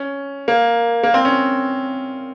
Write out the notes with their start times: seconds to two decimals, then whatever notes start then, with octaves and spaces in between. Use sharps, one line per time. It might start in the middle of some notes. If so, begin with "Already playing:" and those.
Already playing: C#4
0.48 A#3
1.03 A#3
1.14 C4
1.25 C#4